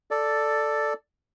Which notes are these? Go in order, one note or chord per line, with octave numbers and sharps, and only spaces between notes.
A4 D5